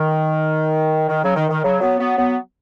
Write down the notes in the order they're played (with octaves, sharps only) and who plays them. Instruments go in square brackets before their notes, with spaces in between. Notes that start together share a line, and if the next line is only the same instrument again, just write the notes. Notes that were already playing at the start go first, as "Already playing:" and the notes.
Already playing: [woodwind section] D#3
D#3
C#3 F#3
D#3
D#3
C#3 F#3
F#3 B3
F#3 B3
F#3 B3